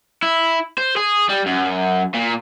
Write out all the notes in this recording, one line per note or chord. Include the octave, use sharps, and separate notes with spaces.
E4
C5
G#4
G3
F#2
A#2